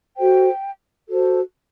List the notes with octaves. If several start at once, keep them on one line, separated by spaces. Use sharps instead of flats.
F#4 A4 C5 G5
F#4 A4 C5